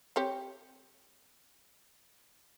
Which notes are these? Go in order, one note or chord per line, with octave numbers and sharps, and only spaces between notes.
C4 G4 C#5